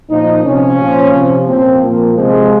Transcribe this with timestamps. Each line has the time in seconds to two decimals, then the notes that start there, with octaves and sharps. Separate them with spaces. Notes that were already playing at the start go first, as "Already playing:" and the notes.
0.10 A#2 F3 D#4
0.44 C3 F3 C#4
0.79 A#2 F3
1.13 C3 F3
1.46 A#2 F3 C4
1.81 A#2 F3 A#3
2.15 C3 F3 G#3